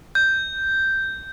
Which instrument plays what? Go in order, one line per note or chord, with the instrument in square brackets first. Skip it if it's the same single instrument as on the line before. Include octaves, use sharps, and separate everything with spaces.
[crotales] G6